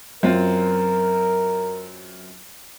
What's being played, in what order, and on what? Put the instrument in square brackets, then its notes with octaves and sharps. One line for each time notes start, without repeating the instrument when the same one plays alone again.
[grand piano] F#2 C4 F4 [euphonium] A#4